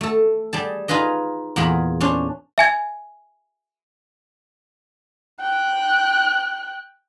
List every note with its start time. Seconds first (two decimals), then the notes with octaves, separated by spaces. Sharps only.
0.01 A3 A4
0.53 G3 G#4 A5
0.88 D#4 F4 G#4 B4 D#5
1.56 E2 A#2 A#3 G#4 B5
2.01 C#4 D4 C5
2.58 E5 G#5 G#6
5.41 G5 F#6